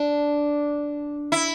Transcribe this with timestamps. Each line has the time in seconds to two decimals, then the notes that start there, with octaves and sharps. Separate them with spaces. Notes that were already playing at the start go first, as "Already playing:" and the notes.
Already playing: D4
1.32 E4